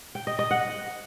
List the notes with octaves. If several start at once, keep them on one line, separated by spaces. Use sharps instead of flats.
G5
D#5
D#5
F#5